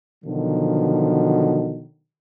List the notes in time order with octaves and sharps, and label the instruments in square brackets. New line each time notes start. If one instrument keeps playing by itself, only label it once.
[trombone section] B2 D3 D#3 F3 F#3